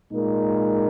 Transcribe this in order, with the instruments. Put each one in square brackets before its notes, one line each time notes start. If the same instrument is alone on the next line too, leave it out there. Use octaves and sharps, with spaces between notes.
[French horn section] A#2 G#3 D#4 A#4